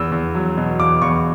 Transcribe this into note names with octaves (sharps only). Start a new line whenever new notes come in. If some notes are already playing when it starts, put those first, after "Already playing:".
Already playing: E2 E6
E2
F#3
B2
E2 D6
E2 C#6